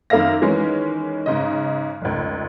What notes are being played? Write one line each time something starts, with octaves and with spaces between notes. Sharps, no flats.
F#2 D#3 A#3 E5 F5 A#6
D#3 E3 G#3 C#4
G#2 C#3 D#5
F1 C#2